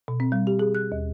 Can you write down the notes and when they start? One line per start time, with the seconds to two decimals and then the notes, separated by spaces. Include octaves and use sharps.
0.08 B2
0.20 C4
0.32 G3
0.47 G4
0.59 G#4
0.75 F#6
0.92 D#2